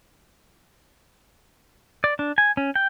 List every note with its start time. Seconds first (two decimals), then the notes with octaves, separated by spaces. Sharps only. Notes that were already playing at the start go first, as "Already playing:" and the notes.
2.04 D5
2.19 D4
2.38 G#5
2.57 C#4
2.76 G5